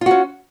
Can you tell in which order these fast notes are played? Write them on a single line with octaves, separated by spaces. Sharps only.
F4 F#4 C#4